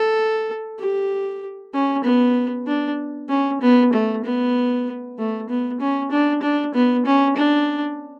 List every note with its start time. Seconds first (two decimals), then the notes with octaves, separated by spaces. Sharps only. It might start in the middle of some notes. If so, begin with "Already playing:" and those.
Already playing: A4
0.79 G4
1.74 C#4
2.04 B3
2.67 D4
3.29 C#4
3.61 B3
3.93 A3
4.24 B3
5.18 A3
5.49 B3
5.80 C#4
6.11 D4
6.42 D4
6.74 B3
7.05 C#4
7.36 D4